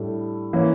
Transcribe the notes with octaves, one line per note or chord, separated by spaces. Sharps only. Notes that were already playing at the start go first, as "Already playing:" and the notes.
Already playing: A2 G3 D4 A4
E3 A#3 C#4